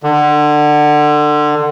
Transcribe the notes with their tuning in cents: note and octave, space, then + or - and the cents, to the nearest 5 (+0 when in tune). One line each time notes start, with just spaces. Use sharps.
D3 +25